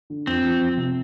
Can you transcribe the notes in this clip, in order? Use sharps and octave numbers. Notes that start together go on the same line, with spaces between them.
D3
F2 C4
F3
F2
C3